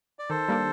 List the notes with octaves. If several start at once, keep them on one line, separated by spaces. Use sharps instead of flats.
D5
D#3 A4 C5
G3 A#3 D4